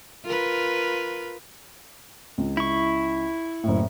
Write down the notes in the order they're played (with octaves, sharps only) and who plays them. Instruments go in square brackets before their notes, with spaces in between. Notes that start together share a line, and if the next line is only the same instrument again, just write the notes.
[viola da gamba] F4 A#4 B4
[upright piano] C#2
[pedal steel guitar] E4 C#6
[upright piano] F#1 A2